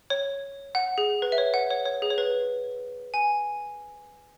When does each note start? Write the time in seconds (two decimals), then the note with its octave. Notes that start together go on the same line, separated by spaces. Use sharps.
0.10 C#5
0.75 F#5
0.98 G#4
1.22 B4
1.32 E5
1.38 C#5
1.54 F#5
1.70 C#5
1.85 C#5
2.02 G#4
2.10 C#5
2.18 B4
3.14 G#5